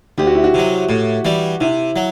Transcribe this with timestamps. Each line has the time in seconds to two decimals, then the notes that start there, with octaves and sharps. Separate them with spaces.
0.18 D2 G4
0.27 F#4
0.35 E4
0.44 F#4
0.54 C3 F#3
0.89 A2
1.25 E3 G3
1.61 C3 E4
1.96 F#3